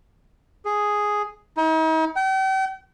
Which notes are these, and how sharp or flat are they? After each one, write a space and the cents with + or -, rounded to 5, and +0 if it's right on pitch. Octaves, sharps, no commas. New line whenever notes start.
G#4 +0
D#4 +45
G5 -40